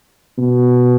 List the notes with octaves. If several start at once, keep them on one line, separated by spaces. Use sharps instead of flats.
B2